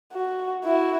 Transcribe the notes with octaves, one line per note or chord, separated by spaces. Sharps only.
F#4
E4 F#4